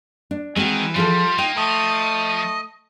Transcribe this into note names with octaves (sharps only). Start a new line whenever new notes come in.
D4
D#3 E3 G#3 C4 F#4
F3 G3 F4 G#4 A4
A#3 D#4 G5
F3 A3 D#5